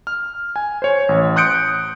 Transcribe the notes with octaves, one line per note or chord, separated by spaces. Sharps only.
F6
G#5
C5 C#5
A1
C6 D#6 F#6 G6 C#7 D7